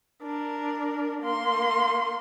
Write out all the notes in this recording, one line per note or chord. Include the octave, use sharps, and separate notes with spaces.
D4 A#4
A#3 C6